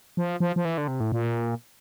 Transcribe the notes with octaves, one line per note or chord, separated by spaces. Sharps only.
F3
F3
F3
E3
D3
C3
A2
A#2